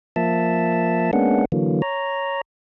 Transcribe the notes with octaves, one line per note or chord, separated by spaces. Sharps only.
F3 A#3 E5 A5
G#3 A#3 B3 C#4 D4 F#5
D3 E3 F#3 A#3
C#5 A#5